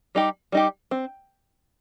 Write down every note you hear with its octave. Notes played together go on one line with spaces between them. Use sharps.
G3 D#4 G4
G3 D#4 G4
C4